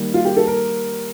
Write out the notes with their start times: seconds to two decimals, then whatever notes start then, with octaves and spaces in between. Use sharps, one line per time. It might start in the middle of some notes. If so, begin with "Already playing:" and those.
Already playing: D#3 G3 A#3
0.14 F4
0.25 G4
0.37 A4
0.47 A#4